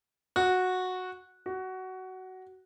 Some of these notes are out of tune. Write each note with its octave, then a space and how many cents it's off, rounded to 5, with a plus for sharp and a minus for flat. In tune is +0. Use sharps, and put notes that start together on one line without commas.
F#4 -10
F#4 +15